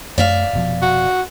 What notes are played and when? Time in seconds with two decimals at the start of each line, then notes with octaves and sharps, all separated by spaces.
0.18 F#2 A3 D5 E5 F5
0.53 F1 B2 F3
0.82 F#4